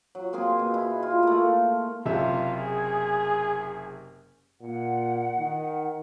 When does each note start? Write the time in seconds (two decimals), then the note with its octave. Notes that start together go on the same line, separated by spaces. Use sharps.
0.15 F#3
0.33 A#3 C4 G#4 G#5
0.59 B2
0.74 E4
1.03 F4
1.23 A3 A#3
2.06 F#1 C3 F4 E5
2.60 G#4
4.61 A#2 F#5
5.38 D#3